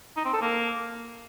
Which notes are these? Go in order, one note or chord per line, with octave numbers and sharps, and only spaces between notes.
D#4
C4
A4
A#3